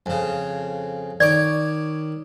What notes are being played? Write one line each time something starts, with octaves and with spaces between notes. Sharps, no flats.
F2 C#3
D#3 C#5 D5 D6